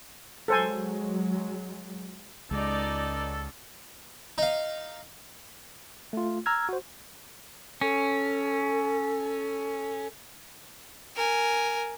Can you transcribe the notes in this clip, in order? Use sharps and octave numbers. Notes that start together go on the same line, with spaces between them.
F#3 G#3 A4 C5 G#5
C#2 G#3 D#4 A4 D5
D#4 F5
A3 F4
A#5 E6 F6 G#6
F#4 C5
C#4 A4
A#4 G#5